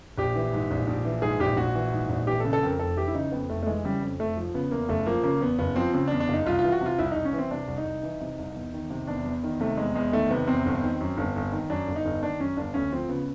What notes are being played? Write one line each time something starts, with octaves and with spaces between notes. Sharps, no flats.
A#1 G4
E3
G#2
A#1
A#1
E3
G#2 G#4
A#1 G4
A#1 F#4
E3
G#2
A#1
E3 G4
A4
C#3
A4
F2 A#4
F1 A4
E3 G4
E4
C#3 D#4
F2 B3
F1 A3
A3
E3 G#3
C#3 G3
F2
F1 A3
F3
C#3 B3
E2 A#3
F#1 A3
F3 A#3
C#3 A#3
E2 B3
F#1 B3
F3 C4
C#3 C4
D4
E2
D4
F#1 D#4
C2 F4
E3 F4
F#4
C3
F4
C2 E4
C2 D#4
C#4
E3
C4
C3 D4
C2
D#4
C2
E3
C3
C2
E2
D#3
C3
E2 D4
E2
D#3
C3 A3
E2 G#3
E2 G#3
D#3 A3
C3 B3
E2 C4
G1
D#3
F#2
G1
G1
D#3
F#2 D4
G1
D#4
G1
D#3 D4
F#2 C#4
G1 D4
D2 C#4
F3 C4
C#3 B3